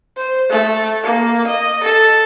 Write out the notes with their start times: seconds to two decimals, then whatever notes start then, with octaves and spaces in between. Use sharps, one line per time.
0.17 C5
0.49 A3
1.03 A#3
1.47 D#5
1.83 A4